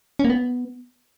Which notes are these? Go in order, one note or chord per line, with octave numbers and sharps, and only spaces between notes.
C#4
A#3
B3